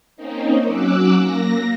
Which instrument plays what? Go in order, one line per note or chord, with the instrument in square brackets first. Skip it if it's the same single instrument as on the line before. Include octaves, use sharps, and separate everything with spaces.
[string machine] A#3 C4 C#4 D#4
F#3 C#4 D6 E6 F#6
A#3 A#6